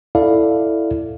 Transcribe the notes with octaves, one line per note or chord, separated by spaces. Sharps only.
E4 A4 D5 F5